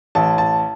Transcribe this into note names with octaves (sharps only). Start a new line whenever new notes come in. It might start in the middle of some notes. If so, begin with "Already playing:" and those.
A1 A5
A5